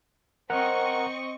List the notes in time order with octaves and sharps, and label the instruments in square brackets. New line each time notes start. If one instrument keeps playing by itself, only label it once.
[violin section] C4 D#5 C#6 [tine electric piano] A#4 F#5 A#5